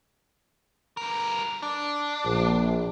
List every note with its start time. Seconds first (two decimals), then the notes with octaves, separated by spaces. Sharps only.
0.97 G3 A#4
1.62 D4
2.25 A#1